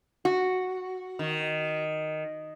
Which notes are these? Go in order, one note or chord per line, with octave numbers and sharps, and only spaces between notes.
F#4
D#3